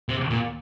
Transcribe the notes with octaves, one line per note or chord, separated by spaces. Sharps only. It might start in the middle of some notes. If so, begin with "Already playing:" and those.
C3
A#2